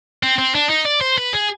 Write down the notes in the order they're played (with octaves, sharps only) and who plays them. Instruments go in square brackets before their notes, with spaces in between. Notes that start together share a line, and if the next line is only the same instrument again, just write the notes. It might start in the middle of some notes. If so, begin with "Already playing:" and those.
[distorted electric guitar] C4
C4
D4
D#4
D5
C5
B4
G#4